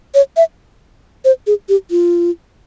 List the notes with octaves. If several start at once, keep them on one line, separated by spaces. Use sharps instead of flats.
C#5
E5
C5
G#4
G4
F4